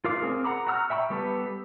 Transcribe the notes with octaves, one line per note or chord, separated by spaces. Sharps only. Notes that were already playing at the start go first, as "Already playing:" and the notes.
F4 A#4 F5 D6
C4 C#4 G#4 A#4
F#5 A#5 B5 D6
F#4 F#5 A#5 E6 F6
E5 G5 B5 C#6
G3 B3 G4 A4 B4